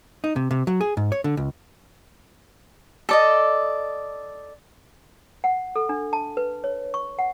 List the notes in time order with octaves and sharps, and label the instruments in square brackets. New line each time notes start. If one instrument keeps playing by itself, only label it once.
[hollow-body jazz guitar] D#4
C3
C3
F#3
G#4
G#2
C#5
D3
C#2
[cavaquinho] A4 D5 D#5
[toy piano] F#5
A4
D4
A5
B4
C#5
C#6
F#5